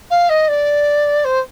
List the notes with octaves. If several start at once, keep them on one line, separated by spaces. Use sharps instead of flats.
F5
D#5
D5
C5